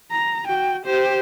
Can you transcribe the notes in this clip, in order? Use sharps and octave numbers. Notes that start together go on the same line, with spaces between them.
A#5
F#4 G5
G4 C5